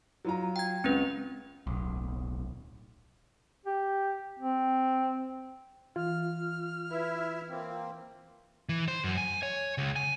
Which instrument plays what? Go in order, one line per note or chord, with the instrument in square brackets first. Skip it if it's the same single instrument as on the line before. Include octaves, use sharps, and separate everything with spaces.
[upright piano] F#3 F4 A#5
[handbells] G5 G#6
[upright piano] C#2 [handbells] C4 C#4 B4
[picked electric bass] D1 B1
[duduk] G4
C4
[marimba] E3 [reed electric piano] F4 [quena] F6
[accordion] E4 E5 [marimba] B4
[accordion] A#3 C4
[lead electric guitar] E3
C5
F#2
G#5
C#5
C#2
G#5